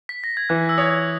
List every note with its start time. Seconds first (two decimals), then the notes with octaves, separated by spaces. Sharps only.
0.09 B6
0.24 A#6
0.37 G#6
0.49 E3 F#6
0.69 E6
0.78 C#5 D#6